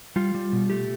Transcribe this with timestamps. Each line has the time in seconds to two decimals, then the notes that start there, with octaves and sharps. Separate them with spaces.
0.16 G3 F4
0.35 G3
0.53 B2
0.70 A3 G4